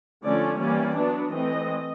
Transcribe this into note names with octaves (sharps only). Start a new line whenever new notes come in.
D3 F3 A3 C#4 D5
E3 G3 A#3 C#4 D5
F#3 B3 D4
E3 A3 C4 D#5